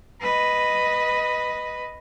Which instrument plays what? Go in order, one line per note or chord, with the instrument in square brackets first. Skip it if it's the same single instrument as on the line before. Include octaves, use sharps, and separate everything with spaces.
[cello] B4 D#5